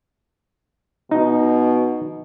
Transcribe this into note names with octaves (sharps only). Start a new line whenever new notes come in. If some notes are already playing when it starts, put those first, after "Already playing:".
B2 D#4